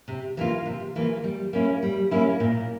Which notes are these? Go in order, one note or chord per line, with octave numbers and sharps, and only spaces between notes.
C3
E3 A#3 F4
C3
E3 A#3 F4
G3
A#3 C#4 E4
G3
A#3 C#4 E4
A#2